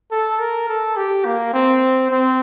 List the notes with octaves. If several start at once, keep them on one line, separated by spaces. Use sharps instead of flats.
A4
A#4
A4
G4
A#3
C4
C4